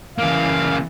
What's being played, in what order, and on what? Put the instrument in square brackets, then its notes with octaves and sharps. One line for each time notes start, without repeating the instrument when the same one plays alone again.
[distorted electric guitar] C#3 A#3 [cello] E3 [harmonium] F5